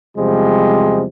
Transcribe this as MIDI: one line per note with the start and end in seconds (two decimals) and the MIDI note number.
0.18 1.05 40
0.18 1.05 48
0.18 1.05 53
0.18 1.05 55
0.18 1.05 56